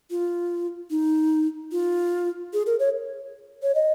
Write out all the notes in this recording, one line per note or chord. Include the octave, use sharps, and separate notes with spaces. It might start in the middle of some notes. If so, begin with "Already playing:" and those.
F4
D#4
F4
G#4
A#4
C#5
C#5
D#5